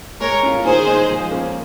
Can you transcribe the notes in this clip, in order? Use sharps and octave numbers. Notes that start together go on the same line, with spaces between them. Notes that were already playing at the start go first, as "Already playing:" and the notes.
G#3 A#4 C#5
C#4 F4
D#3 G#4 C5
G#3 D#4
F3
A#3 C#4